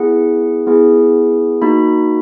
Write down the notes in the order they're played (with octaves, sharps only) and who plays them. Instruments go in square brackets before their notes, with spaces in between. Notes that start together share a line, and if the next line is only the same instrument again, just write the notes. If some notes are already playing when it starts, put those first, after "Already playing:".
Already playing: [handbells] B3 E4 G#4 F#5
B3 E4 G#4
A#3 D#4 F#4 B5